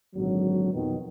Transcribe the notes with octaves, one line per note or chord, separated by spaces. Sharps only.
G#1 A#2 D3 F#3
F2 B2 D#3